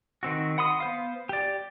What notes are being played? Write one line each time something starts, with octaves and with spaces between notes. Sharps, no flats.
D#3 C4 F#4
F#5 B5 C6 D#6
B3 C5 F5
G4 D5